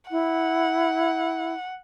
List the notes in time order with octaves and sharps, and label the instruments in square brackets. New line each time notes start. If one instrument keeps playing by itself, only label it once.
[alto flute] E4 [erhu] F#5